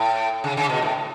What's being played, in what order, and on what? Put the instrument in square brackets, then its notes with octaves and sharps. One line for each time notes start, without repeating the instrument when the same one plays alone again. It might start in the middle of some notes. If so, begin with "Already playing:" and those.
Already playing: [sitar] A2
C#3
C#3
B2
A2